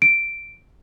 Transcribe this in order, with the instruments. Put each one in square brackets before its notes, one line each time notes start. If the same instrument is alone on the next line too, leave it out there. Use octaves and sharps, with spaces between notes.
[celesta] D7